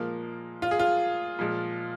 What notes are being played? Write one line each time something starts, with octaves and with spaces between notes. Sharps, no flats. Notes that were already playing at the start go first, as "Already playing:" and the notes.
Already playing: A#2 F3 G#3 A#3
F4
G#4
F4
A#2 F3 G#3